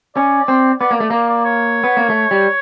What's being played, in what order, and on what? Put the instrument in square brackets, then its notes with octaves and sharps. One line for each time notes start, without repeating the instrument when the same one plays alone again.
[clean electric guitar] C#4 [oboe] D5
[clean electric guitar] C4
[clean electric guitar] B3 [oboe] D5
[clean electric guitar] A#3
[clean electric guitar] A3 [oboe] D5
[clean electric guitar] A#3 [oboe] D5
[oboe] D5
C#5
[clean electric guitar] B3
A#3
A3
G3